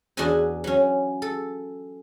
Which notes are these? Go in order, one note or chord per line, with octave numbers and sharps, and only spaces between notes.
E2 D4 F#4 D#5 E5 G#5
F#3 C#4
A4